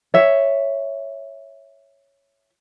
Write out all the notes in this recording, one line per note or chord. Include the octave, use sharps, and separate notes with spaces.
C#5 E5